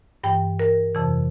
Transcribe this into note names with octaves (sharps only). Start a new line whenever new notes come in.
G2 E3 G5
A#4
F2 C3 E3